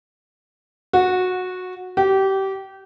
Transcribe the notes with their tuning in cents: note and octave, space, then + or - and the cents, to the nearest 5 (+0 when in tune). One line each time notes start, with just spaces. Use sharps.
F#4 -15
G4 -25